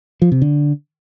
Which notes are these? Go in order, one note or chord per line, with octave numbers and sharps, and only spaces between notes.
F3
C3
D3